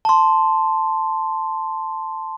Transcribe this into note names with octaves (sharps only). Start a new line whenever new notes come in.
A5 C6